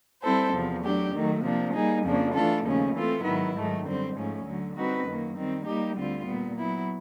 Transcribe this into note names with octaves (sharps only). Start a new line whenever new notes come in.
G3 C4 E4 A4 C5
E2 C3 F3
F#3 A3 D4 G4
D#3 F#3 A3
C3 F3 A#3 D4
G3 A#3 D#4 G#4
F2 C#3 F3 A#3 D4
E3 A3 D4 F4 A4
D#2 C#3 F3 A3 C#4
E3 A3 C4 F4 A4
G#2 D#3 F#3 B3 E4
G#2 D#3 F#3 A3
F#2 D3 G3 C4
G#2 F3 A3 C#4
D2 D3 F#3
G3 C4 D#4 F#4 B4
F#2 D#3 F#3 A#3
D#3 G3 C4
G3 A#3 D#4 G4
D2 D3 G3 C4 F4
A#2 G3 B3
F#3 B3 E4